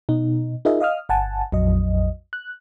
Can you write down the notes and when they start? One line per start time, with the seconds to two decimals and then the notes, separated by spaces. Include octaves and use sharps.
0.09 B2 D#4
0.65 D#4 F4 G#4 A#4 D#5 E5
0.80 D#5 F5 D#6 F6
1.09 G1 F#5 G#5 A5
1.52 A#1 F2 F#3 D#5
2.33 F#6